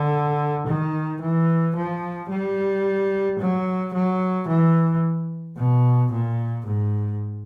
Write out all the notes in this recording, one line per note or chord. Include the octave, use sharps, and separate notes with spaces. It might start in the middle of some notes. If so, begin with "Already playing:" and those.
Already playing: D3
D#3
E3
F3
G3
F#3
F#3
E3
B2
A#2
G#2